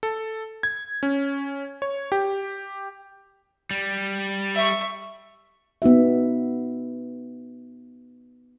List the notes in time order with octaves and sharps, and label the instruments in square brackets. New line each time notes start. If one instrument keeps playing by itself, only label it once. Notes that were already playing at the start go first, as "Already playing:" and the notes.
[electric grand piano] A4
G#6
C#4
C#5
G4
[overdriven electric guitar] G3
[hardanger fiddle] E5 C#6
[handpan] B3 D#4 F#4 E5